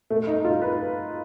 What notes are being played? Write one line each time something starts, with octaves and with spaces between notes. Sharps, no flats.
A3
D#4
F4
B4